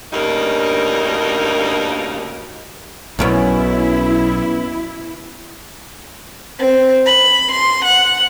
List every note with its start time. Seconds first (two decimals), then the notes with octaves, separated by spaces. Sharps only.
0.13 D2 G2 C#3 A#3 D#4 A#4
3.19 B1 F#2 B2 C#4 E4
6.58 C4
7.05 B5
7.51 C6
7.84 F#5